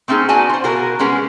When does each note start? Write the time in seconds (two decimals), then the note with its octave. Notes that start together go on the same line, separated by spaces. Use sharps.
0.08 A3 C4 C#4 D#4 G#4
0.29 B3 D#4 F#4 D5 G#5 A5
0.49 F4 C5
0.64 B2 F4 F#4 G#4 A#4
0.99 G3 G#3 B3 C#4 G#4